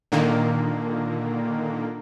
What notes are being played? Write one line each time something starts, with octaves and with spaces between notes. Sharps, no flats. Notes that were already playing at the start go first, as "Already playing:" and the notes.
A#2 D3 D#3 A#3